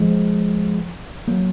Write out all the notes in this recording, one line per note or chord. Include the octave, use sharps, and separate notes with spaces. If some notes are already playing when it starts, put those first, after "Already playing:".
Already playing: F3 G#3
F#3 A#3